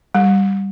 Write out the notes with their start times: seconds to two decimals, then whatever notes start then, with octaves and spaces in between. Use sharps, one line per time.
0.15 G3